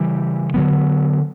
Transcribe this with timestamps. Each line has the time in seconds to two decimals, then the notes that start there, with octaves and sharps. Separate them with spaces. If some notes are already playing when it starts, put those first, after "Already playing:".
Already playing: C#3 E3 G3
0.54 D3 F#3 B3